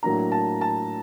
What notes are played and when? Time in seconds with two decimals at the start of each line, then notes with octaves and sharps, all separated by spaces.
0.03 A2 F#3 A#3 D4 A#5
0.32 A5
0.61 A5